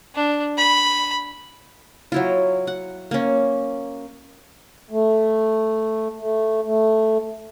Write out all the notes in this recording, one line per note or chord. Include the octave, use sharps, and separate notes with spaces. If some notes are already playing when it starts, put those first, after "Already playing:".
D4
B5
F#3 E4 F4
F#5
A#3 C#4
A3
A3
A3